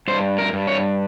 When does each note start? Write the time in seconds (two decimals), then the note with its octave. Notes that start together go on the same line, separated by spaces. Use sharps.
0.08 G2 C5
0.38 A#4
0.53 G2
0.67 C#5